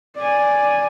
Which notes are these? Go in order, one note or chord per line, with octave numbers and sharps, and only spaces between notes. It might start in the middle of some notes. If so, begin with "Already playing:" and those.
D5 G#5